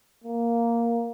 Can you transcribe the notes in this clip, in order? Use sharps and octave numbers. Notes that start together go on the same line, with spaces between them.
A#3